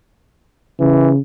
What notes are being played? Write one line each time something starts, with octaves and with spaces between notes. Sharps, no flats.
C#3 E3